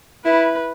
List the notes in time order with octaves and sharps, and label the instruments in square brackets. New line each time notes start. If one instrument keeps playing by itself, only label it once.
[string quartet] E4 [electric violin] B4